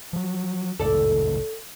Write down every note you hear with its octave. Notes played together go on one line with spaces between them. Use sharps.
F3 F#3
F#1 C#2 A2 A4 D5